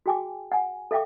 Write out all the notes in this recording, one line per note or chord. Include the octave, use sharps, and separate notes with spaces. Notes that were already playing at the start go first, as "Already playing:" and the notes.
F#4 G#4 G5 G#5 D6
F#5 G#5
A4 E5 F5 G5 D6